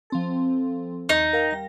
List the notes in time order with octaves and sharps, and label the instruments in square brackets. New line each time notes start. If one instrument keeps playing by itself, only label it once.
[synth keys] F3 C4 A4
[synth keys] D#2 [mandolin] D#4
[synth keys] A#4 F5 G5
G3 A#6